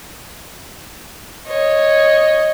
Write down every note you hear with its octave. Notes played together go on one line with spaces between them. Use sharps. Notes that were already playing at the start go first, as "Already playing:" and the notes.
C#5 D#5